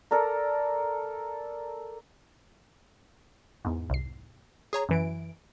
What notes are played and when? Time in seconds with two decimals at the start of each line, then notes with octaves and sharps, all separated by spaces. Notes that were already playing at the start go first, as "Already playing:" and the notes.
0.11 A4 A#4 D5 A#5
3.65 E2 G#2
3.90 C2 C7
4.73 G#4 C#5 A#5
4.89 F#2 E3 D7